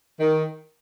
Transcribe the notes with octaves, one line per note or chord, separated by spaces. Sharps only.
D#3